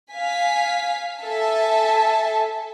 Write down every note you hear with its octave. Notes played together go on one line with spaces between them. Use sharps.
F5 G#5 B6
A4 E5 G#5 A5